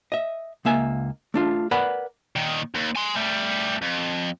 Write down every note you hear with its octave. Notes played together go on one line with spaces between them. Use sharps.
D#5 E5
C#2 A#3 E5 G#5
A3 D4 F4
A#4 B4 D5 F#5 G#5 B5
A#2 D#3
D#2
G#5 C6
G3 A3
F2